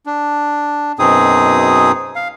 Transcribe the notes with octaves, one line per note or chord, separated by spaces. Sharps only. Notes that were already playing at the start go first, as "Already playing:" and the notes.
D4
F#2 B2 C4 D#4 G#4 D#6
F5